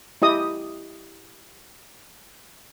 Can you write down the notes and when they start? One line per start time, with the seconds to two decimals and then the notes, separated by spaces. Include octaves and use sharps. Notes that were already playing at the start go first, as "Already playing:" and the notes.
0.22 E4 G4 D#5 D#6